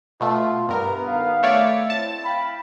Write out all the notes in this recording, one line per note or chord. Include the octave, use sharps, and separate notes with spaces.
B2 A3 F4
G2 B3 A#4
B1 D#3 F5
A3 C#5 D5 E5
C4 E4 C#5 A5
F5 G5 B5